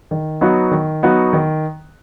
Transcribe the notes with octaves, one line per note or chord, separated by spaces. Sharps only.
D#3
F#3 B3 D#4 F#4
D#3
F#3 B3 D#4 F#4
D#3